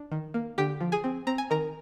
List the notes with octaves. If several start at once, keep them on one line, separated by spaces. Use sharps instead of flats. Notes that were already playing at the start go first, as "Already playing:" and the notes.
Already playing: D4
D#3
A#3
D3 G4 G5
F3
G#4 G#5
C4
C4 A#5
G#5
D#3 A#4 A#5